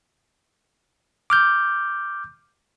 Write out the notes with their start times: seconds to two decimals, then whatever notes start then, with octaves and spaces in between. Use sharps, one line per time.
1.30 D6 F6 G6